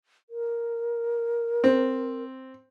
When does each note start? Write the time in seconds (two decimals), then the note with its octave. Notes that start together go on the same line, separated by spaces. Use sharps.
0.30 A#4
1.64 C4